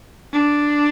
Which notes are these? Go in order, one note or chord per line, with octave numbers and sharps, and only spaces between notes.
D4